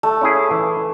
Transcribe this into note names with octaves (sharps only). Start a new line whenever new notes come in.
A3
C#4 E4 G#4
E3